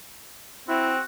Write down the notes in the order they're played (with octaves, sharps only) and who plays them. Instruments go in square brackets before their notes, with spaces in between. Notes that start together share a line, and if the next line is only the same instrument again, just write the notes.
[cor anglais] C4 [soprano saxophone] E4 [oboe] F#4